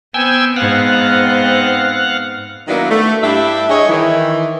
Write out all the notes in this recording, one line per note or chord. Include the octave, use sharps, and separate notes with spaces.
B3 C4 G5 G#5 E6
G#2 B3 C4 F5 F#5
D#3 F#3 A#3 B3 D4 E4
A3
G2 D4 E4 G4 E5
G#4 C#5 D#5
D#3 E3